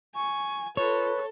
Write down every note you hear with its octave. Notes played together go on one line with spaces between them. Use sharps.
G#5 C#6
F4 A4 B4 C#5